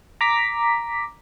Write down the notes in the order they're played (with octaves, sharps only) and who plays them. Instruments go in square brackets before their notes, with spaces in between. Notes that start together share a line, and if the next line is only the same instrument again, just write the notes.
[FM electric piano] A#5 D6 B6